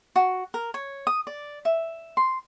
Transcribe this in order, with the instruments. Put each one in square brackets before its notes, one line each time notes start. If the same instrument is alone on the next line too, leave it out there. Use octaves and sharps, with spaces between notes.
[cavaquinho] F#4
A#4
C#5
D#6
D5
E5
C6